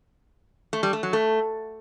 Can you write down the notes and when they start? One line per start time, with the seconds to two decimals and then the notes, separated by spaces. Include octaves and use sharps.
0.73 A3
0.83 G3
0.93 A3
1.03 F#3
1.13 A3